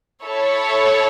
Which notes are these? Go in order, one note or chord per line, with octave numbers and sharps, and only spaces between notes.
E4 A4 C#5